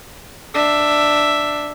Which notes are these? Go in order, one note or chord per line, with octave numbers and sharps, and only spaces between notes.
D4 E5